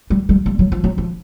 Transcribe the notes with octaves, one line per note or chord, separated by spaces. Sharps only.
G3
G3
G3
F#3
F3
F#3
F3